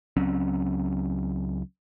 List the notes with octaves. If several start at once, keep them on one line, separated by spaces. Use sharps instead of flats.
C#2 F#3 C4 C#4